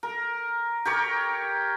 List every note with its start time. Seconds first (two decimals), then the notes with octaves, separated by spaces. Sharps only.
0.03 A#4
0.85 G4 A#4 C#5